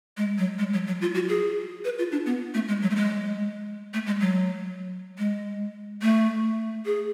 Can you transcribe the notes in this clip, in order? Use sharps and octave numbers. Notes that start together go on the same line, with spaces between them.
G#3
F#3
G#3
F#3
F#3
F4
F#4
G#4
B4
F4
D4
B3
A3
G#3
F#3
A3
G#3
A3
G#3
F#3
G#3
A3
G#4